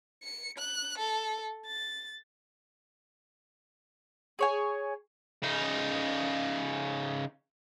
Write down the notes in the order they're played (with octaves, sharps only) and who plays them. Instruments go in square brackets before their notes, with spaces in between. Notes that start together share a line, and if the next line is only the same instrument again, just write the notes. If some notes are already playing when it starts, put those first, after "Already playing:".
[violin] C#7
F#6
A4
A6
[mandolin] G#4 C#5 G#5
[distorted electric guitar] C#3 D#4